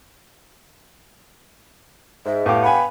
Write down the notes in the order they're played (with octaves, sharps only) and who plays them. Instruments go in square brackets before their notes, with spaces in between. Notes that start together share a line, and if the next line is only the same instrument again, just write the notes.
[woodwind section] G#2 [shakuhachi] E5
[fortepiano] A2 D6 [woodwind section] B3 G4 F5
[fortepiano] F#5 G#5 [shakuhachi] B5